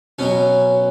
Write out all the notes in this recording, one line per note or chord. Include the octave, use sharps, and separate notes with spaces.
B2 F#3 C#4